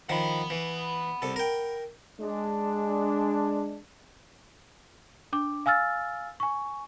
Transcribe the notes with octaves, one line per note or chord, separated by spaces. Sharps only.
D#3 F3 F#5 B5
E3
C2 A4
A#4 G5
G#3 D4
D4 D6
F5 G#5 E6 F6 A6
G#5 C#6